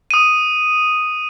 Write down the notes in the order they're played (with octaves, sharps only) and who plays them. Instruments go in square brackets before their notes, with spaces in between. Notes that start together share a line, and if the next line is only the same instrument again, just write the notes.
[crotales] D#6 D#7